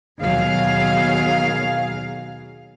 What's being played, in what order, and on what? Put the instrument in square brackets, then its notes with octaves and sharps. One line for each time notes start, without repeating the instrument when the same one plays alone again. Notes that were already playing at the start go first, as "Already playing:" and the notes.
[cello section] D#2 B2 F#3 G#4 F5